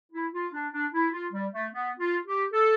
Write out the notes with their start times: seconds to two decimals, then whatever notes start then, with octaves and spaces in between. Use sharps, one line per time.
0.12 E4
0.33 F4
0.53 D4
0.72 D4
0.93 E4
1.12 F4
1.32 G3
1.53 A3
1.73 B3
1.99 F4
2.26 G4
2.52 A4